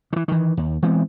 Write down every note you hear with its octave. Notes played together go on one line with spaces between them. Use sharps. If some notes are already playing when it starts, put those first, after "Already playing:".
D#3 E3
D#3 E3
D#2
E3 G#3 B3 C4